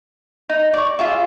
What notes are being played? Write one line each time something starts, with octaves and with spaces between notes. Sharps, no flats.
D#4
D5 C#6
F4 G#4 E5